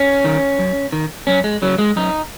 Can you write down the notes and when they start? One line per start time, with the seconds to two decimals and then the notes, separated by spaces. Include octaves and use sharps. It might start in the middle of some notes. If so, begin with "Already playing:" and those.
Already playing: C#4
0.24 D#3
0.59 F#2
0.92 D#3
1.27 F#2 C#4
1.44 G#3
1.62 C#3 F#3
1.78 G#3
1.96 F#2 D#4